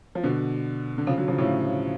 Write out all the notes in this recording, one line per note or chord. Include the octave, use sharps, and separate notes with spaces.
F3
B2 D3
D3
C#3 F3
D3 F#3
C#3 F3
A2 C#3